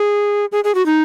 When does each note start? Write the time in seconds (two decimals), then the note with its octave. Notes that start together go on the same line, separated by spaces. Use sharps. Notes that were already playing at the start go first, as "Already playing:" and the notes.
Already playing: G#4
0.52 G#4
0.64 G#4
0.75 F#4
0.86 D#4